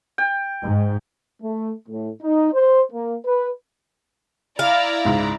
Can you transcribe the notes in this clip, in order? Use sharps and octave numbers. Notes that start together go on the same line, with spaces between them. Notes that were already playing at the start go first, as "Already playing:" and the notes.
G5
G#2
A3
A2
D#4
C5
A#3
B4
E4 D5 F5 A#5
C#2 G#2